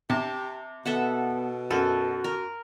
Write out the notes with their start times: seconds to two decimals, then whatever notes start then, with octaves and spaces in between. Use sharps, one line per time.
0.10 C3 G4 A5
0.85 B2 B3 A4 E5 F#5
1.71 F#2 F#4 A4
2.24 A#4